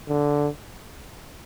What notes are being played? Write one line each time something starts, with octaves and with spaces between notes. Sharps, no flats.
D3